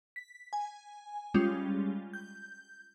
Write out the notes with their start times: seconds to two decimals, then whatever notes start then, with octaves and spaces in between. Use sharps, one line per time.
0.16 B6
0.53 G#5
1.34 G3 G#3 C#4 F4
2.13 G6